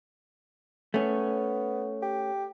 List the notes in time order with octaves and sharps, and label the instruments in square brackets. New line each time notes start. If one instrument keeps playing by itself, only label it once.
[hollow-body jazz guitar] A3 C#4 [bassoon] B3
[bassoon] G4